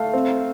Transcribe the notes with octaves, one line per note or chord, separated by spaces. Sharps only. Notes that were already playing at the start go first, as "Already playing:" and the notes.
Already playing: A3 F5
C4